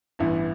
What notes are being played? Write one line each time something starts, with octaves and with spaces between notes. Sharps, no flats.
A1 G2 E3 B3 E4